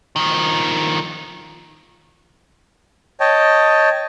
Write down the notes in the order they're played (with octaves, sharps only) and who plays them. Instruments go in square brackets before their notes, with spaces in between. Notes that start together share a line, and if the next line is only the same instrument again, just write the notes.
[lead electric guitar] D#3 F3
[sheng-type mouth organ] C#5 D#5 G5 A5